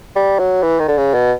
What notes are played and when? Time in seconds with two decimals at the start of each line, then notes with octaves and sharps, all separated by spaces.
0.16 G3
0.39 F#3
0.62 E3
0.80 D#3
0.88 D3
0.98 C#3
1.14 B2